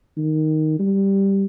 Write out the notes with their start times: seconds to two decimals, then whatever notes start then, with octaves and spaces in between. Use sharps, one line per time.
0.17 D#3
0.79 G3